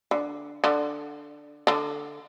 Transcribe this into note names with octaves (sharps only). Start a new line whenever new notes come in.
D3
D3
D3